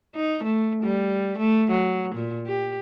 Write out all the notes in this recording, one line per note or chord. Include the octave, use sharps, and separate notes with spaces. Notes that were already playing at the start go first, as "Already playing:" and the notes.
D#4
A3
G3
A3
F#3
A#2
G4